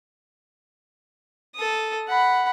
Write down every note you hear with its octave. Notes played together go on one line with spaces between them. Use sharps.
A4 D#6
F#5 B5